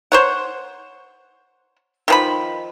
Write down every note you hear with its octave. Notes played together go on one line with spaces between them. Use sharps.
C5 C#5 F#5
D#3 F3 B5